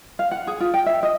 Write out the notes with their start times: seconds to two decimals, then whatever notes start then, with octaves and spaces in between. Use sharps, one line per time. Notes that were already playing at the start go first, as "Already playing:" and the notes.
0.19 F5
0.31 F#5
0.47 G#4
0.60 F4
0.74 G5
0.86 E5
1.03 D#5